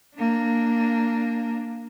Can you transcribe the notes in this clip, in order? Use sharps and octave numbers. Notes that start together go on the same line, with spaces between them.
A#3 D4